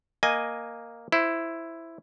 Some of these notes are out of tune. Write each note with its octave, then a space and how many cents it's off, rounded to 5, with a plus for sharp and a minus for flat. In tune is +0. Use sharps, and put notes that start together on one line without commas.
A#3 +0 D#5 -5 G#5 +0
E4 +5 C5 +0